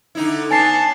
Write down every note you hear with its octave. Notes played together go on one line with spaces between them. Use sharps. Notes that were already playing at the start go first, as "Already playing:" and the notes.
D3 D#4 E4
B3 C#4 G#5 A5 A6 C7